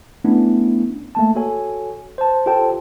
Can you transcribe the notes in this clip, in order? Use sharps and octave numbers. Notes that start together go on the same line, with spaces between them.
A3 B3 C#4 D4 E4
A3 A#3 A5
F#4 A4 C#5 G#5
C5 A5
F4 G4 A4 C5 G5 A5